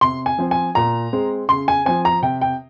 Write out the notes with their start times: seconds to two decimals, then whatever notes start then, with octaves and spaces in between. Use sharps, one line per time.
0.01 C3 C6
0.26 G#5
0.38 F3 C4
0.51 G#5
0.75 A#2 A#5
1.13 G#3 C4
1.49 C#3 C6
1.68 G#5
1.85 F3 C4 G#5
2.05 A#5
2.22 C3 G5
2.41 G5